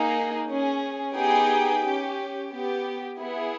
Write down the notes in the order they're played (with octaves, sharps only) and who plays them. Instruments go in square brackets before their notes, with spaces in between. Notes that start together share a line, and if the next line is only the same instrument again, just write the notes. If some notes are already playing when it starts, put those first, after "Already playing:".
Already playing: [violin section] A#3 D#4 G#4
C#4 G#4
B3 D#4 G4 G#4 G5
C#4 G4
B3 G4
B3 E4 G#4